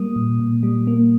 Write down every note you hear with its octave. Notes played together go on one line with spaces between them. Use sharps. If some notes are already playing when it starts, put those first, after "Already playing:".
Already playing: G3 A#3 D#6
A#2
A#2
G3
A#3